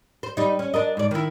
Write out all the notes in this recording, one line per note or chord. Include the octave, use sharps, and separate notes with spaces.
C5
G3 D#4
C#4
D4 A#4 D#5
G#2 D5
D#3 E4